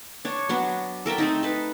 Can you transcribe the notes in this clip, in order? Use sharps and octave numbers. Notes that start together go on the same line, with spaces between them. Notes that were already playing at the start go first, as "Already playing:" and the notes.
D4 C#5
F#3 B3 D4
A4 A#4 E5 G5
A3 C4 D#4
A4 B4